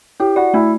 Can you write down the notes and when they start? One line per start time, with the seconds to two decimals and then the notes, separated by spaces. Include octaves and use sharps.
0.20 E4 G4
0.36 F#4 D5
0.54 A3 E4